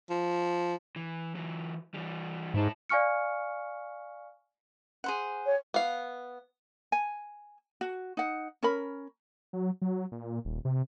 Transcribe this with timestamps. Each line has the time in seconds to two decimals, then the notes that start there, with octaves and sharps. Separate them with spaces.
0.10 F3
0.96 E3
1.35 E3 F#3
1.94 E3 G3
2.54 G#2 E4 A5
2.89 D5 F5 G#5 C#6 F6 C#7
5.04 G#4 C5 F#5
5.44 C#5
5.74 B3 F5
6.92 G#5
7.81 F#4
8.17 D#4 F#5
8.63 C#4 A#4 B5
9.53 F#3
9.82 F#3
10.12 A#2
10.45 D#1
10.65 C3